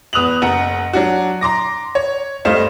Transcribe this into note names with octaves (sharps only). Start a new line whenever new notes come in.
E2 B4 D#6 F#6 F7 F#7
F#1 F#5 A#5
F#3 D4 F#4
A#5 C6 D6 A#6
C#5
G2 A3 C5 D#5 F5 E7